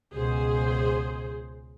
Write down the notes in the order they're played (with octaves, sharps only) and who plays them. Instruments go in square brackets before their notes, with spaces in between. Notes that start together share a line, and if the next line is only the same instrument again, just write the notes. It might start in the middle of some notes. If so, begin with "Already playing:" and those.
[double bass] C#2 B2 [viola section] G#4 C5